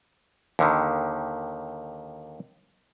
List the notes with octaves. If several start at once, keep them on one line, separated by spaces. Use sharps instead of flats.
D#2 D3 D#3